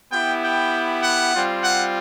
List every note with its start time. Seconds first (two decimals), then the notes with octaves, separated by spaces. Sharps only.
0.12 B3 E4 G4 G5
0.43 G5
1.02 F#5
1.33 G3 C4 F4
1.63 F#5